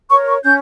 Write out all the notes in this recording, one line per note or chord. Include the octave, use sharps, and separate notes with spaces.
A#4 C#5 C#6
C#6
C#4 G6